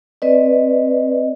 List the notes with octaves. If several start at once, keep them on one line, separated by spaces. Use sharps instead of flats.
C4 B4 D5 D#5